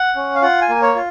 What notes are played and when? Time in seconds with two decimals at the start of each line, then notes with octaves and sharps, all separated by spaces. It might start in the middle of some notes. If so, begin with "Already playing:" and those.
Already playing: F#5
0.16 C#4
0.35 F5
0.42 F4 F#5
0.62 G#5
0.69 A#3
0.82 C#5
0.95 F4